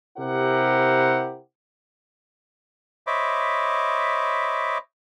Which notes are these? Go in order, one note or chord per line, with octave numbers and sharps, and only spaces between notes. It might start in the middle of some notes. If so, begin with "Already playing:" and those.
C3 E4 G4 A#4 C5 F#5
C5 C#5 D#5 E5 B5 D6